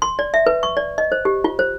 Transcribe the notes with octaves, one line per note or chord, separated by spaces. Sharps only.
C6
D5
E5
B4
C#6
D5
D#5
C5
G4
F4
C5